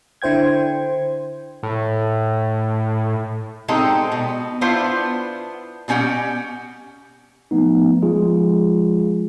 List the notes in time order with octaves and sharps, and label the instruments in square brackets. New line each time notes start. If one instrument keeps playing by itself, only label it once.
[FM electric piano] D3 E4 C5 G5 G#6
[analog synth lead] A2
[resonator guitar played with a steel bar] D3 G#3 C4 D#4 G4 A4
B2
B3 D4 E4 F4 C5
B2 G3 C#4 G4 F#5
[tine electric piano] F3 A3 B3 D#4
F3 G#3 F4 G#4